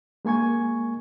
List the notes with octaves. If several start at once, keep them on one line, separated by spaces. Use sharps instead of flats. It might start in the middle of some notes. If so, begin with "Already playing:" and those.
G#3 A#3 G#5 C#6 G#6